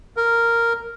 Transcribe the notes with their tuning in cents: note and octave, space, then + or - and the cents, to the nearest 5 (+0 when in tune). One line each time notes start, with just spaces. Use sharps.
A#4 -5